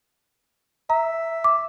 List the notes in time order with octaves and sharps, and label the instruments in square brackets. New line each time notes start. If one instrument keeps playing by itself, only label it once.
[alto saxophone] E5 [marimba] A#5
[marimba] D6